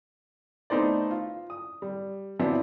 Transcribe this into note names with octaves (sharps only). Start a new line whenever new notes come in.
A3 B3 D#4 C5 D5
F4
D#6
G3
F3 F#3 B3 C4 D4 E4